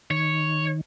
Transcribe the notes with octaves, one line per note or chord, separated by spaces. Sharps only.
D#3 C#5